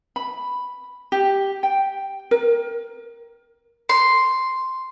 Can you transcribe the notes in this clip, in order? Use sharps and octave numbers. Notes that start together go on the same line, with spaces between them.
B5
G4
G5
A#4
C6